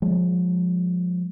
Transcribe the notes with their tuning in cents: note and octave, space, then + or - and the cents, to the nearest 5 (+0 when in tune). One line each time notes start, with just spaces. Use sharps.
F3 +30 G#3 -5